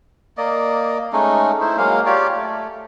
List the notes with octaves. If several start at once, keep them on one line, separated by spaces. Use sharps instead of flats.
A#3 D5 D#5
G#3 A3 C#4 D#4
D#4 E4 C5
F#3 G#3 A#3 F5
F4 G4 C#5 D5
A3